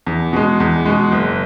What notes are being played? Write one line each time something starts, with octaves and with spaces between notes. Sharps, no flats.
E2
B2 G#3
E2
B2 G#3
F#1